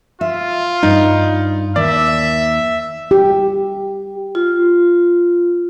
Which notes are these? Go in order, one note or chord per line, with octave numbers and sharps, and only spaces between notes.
F4 E5
G2 D#4
D#2 D5 E5
G4
F4